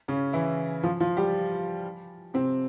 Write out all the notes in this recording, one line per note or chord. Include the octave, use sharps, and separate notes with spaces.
C#3 C#4
E3 E4
F3 F4
F3 F4
G3 G4
C3 C4